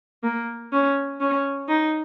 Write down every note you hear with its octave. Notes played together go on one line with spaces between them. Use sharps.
A#3
C#4
C#4
D#4